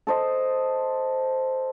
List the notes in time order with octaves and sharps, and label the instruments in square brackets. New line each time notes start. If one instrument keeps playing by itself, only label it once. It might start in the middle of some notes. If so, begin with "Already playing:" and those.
[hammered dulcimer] A4 C5 D#5